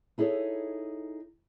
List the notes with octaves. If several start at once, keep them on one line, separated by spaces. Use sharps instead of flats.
D#4 E4 G#4 A4 C#5